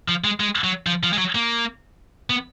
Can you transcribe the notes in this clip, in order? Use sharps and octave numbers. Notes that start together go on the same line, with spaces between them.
F3
G#3
G#3
F#3
F3
F3
G#3
F#3
A#3
B3